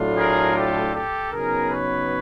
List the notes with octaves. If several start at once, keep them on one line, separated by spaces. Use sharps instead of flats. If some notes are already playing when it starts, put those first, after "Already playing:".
Already playing: A2 F#3 A3 D4 F4
G#4 A#4
G4 A4
G4 A4
C#3 F#3 B3 D#4 G#4 A#4
B4 C#5